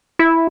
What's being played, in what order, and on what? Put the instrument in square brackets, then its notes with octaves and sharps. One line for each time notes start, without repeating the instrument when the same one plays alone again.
[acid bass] E4